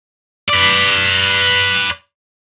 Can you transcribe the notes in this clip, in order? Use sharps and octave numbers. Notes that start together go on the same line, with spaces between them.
B4 D5